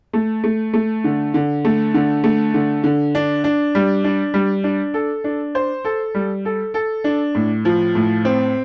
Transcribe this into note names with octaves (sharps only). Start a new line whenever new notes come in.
A3
A3
A3
D3
D3
A3
D3
A3
D3
D3
D4
D4
G3
D4
G3
D4
A4
D4
C5
A4
G3
A4
A4
D4
A2
F3
A2
C4